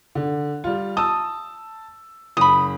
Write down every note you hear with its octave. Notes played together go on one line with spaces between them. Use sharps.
D3
G3 F4
A5 D#6 E6
F#1 B5 D#6